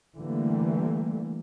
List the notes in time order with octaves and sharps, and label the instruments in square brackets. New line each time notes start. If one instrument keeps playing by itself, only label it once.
[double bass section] D3 E3 G3 A3 A#3